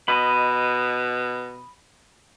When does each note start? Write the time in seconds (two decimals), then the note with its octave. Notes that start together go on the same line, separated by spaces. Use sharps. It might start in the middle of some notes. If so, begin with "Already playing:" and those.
0.08 B2 D#5 B5